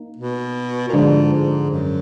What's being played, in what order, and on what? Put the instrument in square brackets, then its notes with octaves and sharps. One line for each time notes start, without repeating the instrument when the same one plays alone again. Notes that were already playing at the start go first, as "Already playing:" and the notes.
Already playing: [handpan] A#3 D#4
[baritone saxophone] B2
A#2
[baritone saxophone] G#2 [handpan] D3 F3 G#3 D4
[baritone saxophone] G#2
F#2